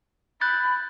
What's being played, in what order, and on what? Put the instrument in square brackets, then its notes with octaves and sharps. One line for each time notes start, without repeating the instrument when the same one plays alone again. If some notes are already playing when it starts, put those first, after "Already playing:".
[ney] B5 [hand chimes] F#6 G6 A6